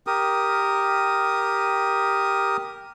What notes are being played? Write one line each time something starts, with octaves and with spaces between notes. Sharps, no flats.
G4 A#4 D#6